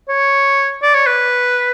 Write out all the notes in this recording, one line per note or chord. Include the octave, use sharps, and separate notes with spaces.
C#5
D5
C#5
B4